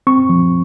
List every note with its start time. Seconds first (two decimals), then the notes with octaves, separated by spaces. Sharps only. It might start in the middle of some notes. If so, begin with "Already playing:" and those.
0.07 C4 C#6
0.29 F3